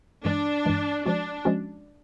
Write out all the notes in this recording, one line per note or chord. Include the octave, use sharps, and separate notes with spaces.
G2 E3 G#3 D4
G2 E3 G#3
F3 G#3 C#4 D4 F#4
F3 G#3 C#4 F#4